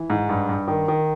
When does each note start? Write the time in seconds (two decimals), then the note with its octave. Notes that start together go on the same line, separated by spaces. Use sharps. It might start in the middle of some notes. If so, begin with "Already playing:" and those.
Already playing: E3
0.10 G#2
0.29 G2
0.49 G2
0.68 D#3
0.88 D#3